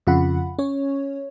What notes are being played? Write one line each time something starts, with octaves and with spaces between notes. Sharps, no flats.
F2 C#3 F4 F#5 B5
C#4 C#5